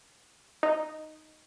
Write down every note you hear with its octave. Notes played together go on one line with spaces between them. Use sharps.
D#4